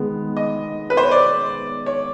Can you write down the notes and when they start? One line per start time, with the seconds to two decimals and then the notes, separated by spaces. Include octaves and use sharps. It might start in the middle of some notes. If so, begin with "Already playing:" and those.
Already playing: D#3 G#3 B3
0.37 D#5
0.90 B4
0.97 C5
1.04 C#5
1.11 D5
1.86 C#5